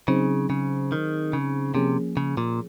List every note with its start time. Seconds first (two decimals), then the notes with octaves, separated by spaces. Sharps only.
0.08 C#3 F#3 C4 D#4 G#4 C5
0.50 C#3
0.92 D#3
1.33 C#3
1.75 C3 F3 A#3 C#4 G#4
2.17 C#3
2.37 A#2